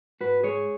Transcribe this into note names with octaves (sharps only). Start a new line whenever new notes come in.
G#2 F#4 B4
G#3 G#4 C#5